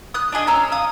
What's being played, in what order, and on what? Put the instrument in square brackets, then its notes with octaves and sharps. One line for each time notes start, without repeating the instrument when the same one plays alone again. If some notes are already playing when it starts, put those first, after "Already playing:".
[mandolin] D#6 F#6
D4 F4 G#4 D#5
C#4 A#5 E6 F6
F5 D#6